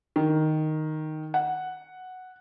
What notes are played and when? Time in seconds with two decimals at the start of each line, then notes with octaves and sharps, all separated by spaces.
0.16 D#3
1.34 F#5